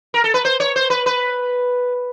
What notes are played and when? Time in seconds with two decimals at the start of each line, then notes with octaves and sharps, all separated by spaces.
0.14 A#4
0.24 A4
0.34 B4
0.45 C5
0.60 C#5
0.76 C5
0.90 B4
1.06 B4